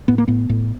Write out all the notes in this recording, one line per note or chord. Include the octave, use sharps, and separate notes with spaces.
A2 B3
A#3
A2 B3
A2